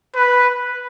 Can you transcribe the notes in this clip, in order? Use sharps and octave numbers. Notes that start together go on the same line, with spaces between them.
B4